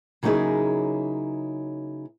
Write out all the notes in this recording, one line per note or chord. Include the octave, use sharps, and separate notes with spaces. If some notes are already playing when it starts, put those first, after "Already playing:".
C#3 F#3 A#3 D#4 E4 G#4